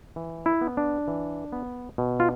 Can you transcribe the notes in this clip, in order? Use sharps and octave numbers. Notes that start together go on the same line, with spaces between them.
E3
E4
B3
D4
E3
B3
B2
F4